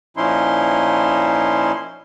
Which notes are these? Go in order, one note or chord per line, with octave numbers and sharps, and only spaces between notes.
A#2 F3 C#4 D#4 E4 C6